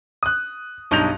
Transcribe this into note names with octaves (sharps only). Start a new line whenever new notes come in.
D#6 F#6
B1 G2 D#4 G6 F7